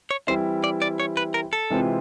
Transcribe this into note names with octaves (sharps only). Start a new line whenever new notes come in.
C#5
E3 G3 C4 E4 C5
D5
D5
C#5
B4
A#4
A4
C3 E3 G#3 C4 F4